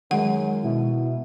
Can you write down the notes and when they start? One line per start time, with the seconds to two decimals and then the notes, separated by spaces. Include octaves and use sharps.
0.11 F#2 D#3 G#3 F#5
0.63 B2 E4